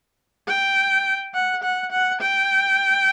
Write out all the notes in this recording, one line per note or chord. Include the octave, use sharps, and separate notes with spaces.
G5
F#5
F#5
F#5
G5